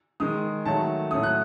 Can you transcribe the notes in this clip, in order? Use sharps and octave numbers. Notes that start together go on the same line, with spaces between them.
D#3 G#3 D#6
D#3 F#3 A3 A5
A2 F#3 A3 D#6
F#6